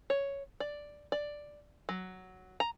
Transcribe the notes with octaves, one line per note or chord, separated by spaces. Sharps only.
C#5
D5
D5
F#3
A#5